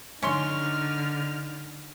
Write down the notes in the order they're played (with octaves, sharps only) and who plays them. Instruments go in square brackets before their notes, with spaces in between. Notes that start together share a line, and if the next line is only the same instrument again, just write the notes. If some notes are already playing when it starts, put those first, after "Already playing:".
[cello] D3 [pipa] C#4 C#5 C6 [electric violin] D#4 F6